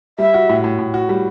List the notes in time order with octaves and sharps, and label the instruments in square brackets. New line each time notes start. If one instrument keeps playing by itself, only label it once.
[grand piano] G3 [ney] E5
[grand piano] F#4
A2
A2
A2
F#4
G3